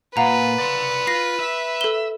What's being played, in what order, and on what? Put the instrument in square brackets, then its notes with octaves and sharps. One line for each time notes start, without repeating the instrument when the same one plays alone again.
[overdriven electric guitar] A#2 [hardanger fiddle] B4 [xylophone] F5 F#5 A#5
[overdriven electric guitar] D5 C6
[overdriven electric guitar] F4 [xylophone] A#6 C7
[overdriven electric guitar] E5
[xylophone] A4 G7